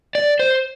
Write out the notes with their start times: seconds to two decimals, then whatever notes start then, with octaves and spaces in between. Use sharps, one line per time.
0.15 D5
0.39 C5